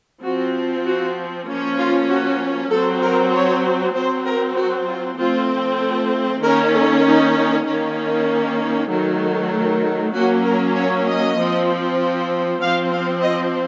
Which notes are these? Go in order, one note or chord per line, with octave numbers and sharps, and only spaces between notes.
F3 C4 F#4
F#4
F3 A#3 C#4
F4
F#4
F#3 C4 A4
A#4
C#5
F#3 C4 C5
A#4
F#4
F4
F3 A3 C4 F4
A4
D#3 A#3 C#4 A#4
A4
D#4
D#3 A#3 C#4
D#3 F#3 A3
F#3 A#3 C#4 F#4
A#4
C#5
D#5
F3 C4
F3 C4 F5
F5
D#5